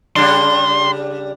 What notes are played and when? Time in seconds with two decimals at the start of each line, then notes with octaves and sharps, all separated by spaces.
0.16 C#3 G3 D4 C6